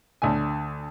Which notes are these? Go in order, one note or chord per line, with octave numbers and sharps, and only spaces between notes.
D2 A3 G#5